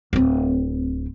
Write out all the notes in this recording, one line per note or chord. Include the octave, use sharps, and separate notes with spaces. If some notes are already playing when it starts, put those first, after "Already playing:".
D1 C4